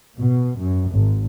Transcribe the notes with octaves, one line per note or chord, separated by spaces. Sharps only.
B2
F#2
G#1